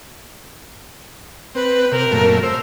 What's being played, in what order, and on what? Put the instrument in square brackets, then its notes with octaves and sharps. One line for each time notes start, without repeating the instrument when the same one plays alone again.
[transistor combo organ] C4 [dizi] B4
[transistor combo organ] C3 [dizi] A#4
[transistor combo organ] F#2 A#2 A3
[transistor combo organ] C5 [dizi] E6